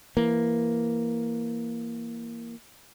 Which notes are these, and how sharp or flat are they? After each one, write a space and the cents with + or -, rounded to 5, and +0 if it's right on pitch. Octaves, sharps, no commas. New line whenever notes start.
E3 +15 A#3 +0